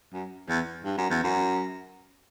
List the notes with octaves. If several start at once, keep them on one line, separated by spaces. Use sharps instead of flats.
F#2
E2
G2
F#2
E2
F#2